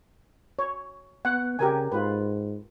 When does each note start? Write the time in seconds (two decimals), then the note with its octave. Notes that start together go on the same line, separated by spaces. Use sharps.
0.59 C#5
1.25 B3 F#5
1.59 C#3 G4 A#4 G#5
1.92 G#2 F4 B4